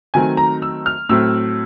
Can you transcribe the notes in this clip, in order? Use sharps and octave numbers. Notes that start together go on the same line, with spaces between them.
D#3 F#3 A3 C4 G#5
A#5
E6
F6
A2 F#3 A3 C4 E6